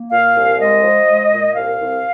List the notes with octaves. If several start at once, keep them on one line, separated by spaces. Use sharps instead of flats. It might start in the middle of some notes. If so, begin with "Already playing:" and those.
Already playing: A#3
A#2 F5
C2
G#3 D#5
F3
G#3
A#2
C2 F5
C2